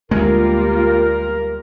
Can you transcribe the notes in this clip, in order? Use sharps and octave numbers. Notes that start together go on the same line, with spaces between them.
D2 G3 G#3 A#3 F4 A#4